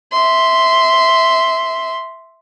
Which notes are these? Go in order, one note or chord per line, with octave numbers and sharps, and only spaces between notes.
E5 C6